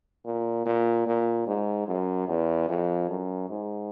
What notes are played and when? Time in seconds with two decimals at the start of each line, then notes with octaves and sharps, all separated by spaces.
0.25 A#2
0.65 A#2
1.07 A#2
1.47 G#2
1.87 F#2
2.28 E2
2.69 F2
3.09 F#2
3.49 G#2